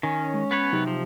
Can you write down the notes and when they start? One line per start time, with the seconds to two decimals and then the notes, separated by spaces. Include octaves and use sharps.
0.03 D#3 C#4
0.34 G#3
0.51 B3 B4 C#5
0.73 C3 F#3 D#4 G4
0.87 F3